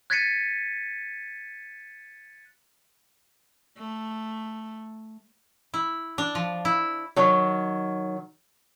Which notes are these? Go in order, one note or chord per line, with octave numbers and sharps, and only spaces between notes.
F#6 G#6 A6 B6 C#7 D#7
A3
E4
D4
F3
E4
D#3 F#3